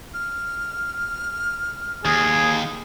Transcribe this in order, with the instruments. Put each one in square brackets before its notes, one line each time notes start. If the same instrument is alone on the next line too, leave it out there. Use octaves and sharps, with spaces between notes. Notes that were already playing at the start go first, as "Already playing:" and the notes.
[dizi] F6
[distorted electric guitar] D#2 [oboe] G#4